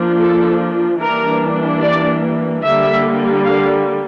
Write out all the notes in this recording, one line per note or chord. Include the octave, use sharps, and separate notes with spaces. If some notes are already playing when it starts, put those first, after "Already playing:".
Already playing: F3 A#3 D4
A4
E3 G3 A#3 D4 A#4
D5
D3 G3 A#3 E5
F5